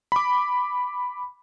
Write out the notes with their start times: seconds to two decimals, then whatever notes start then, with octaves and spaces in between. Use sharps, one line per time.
0.12 B5 D6